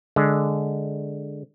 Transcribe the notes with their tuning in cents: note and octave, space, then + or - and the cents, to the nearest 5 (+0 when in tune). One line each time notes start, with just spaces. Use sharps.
D3 +0 G#3 +5